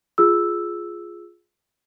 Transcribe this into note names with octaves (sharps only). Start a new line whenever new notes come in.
F4 G#4 E6